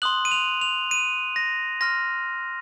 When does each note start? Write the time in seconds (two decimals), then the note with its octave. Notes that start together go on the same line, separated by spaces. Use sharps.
0.02 C6 D#6 F#6 F#7
0.25 D#7
0.31 F7
0.61 F7
0.91 D#7
1.36 A#6
1.81 C6 F6 A#6